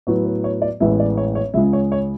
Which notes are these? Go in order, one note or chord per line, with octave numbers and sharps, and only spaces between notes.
A2 F#3 B3 C#5
B4
C#5
D5
A1 A2 G#3 B3 E5
D5
C#5
C#5
C#2 C#3 G#3 E5
C#5
C#5